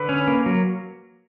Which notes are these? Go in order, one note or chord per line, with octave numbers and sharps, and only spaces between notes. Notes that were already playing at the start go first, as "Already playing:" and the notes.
Already playing: D3 B4
C#4
A#3
F#3